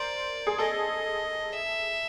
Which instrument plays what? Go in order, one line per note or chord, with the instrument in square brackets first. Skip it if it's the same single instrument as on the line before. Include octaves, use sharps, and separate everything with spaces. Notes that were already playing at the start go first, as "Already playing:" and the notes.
Already playing: [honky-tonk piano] A#4 C5 [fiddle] D5
[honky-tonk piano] G#4
[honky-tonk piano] A4 [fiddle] D#5
[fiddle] E5